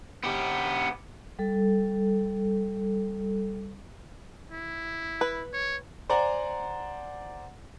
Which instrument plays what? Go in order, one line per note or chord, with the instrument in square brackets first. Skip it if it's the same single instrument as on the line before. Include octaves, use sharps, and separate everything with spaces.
[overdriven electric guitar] B3 G4
[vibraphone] G3 A4
[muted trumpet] E4
[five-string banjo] B4
[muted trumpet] C#5
[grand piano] C5 D5 F#5 G#5 A#5